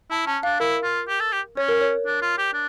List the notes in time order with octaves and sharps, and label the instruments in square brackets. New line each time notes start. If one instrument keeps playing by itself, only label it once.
[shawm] E4 [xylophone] A5
[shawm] C#4 [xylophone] A5
[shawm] D4 [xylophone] F5
[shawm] E4 [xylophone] A#4
[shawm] F4
G4
A4
G4
[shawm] C#4 [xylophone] C#5
[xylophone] A#4
C#5
[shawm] D4
F4
G4
D4